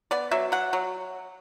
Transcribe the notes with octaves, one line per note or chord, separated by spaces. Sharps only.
B3 D5
F#3 E5
F#3 F#5
F#3